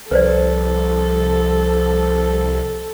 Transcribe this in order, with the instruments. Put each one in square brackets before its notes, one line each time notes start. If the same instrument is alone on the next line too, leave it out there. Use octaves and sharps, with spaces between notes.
[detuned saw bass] C2 [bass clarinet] F3 [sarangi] A4 [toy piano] B4 C5 D5